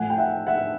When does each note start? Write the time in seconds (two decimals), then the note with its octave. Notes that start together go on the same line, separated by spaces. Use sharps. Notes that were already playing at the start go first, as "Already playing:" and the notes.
Already playing: A2 F3 A3 F#5 G#5
0.10 G5
0.18 E5 F#5
0.47 E5 F#5